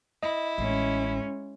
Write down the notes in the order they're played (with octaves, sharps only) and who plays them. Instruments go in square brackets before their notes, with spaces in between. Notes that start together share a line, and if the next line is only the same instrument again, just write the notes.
[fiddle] E4 [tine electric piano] D#5
[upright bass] A1 [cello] G#3 C#4